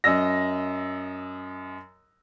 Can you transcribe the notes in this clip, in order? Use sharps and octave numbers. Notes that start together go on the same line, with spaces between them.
F#2 D#5 E6 A#6